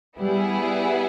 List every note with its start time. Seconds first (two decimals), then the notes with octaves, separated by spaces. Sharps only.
0.18 G3 B3 E4 G#4
0.54 G3